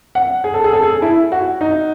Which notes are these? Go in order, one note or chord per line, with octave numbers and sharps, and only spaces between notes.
F#5
G#4
A4
G#4
A4
G#4
E4
F#4
D#4